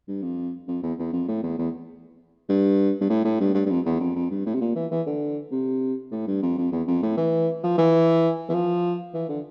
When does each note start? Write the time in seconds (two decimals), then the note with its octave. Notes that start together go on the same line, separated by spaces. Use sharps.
0.08 G2
0.22 F2
0.68 F2
0.83 E2
0.99 E2
1.13 F2
1.28 A2
1.43 E2
1.58 E2
2.49 G2
3.01 G2
3.10 A2
3.25 A2
3.40 G2
3.55 G2
3.66 G2
3.70 F2
3.86 E2
4.00 F2
4.16 F2
4.31 G2
4.46 A2
4.55 C3
4.61 A#2
4.76 E3
4.91 E3
5.07 D3
5.52 C3
6.12 A2
6.27 G2
6.42 F2
6.58 F2
6.72 E2
6.88 F2
7.03 A2
7.18 E3
7.64 F3
7.78 E3
8.49 E3
8.54 F3
9.14 E3
9.29 D3